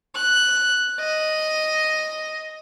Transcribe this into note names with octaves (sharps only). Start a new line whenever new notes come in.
F#6
D#5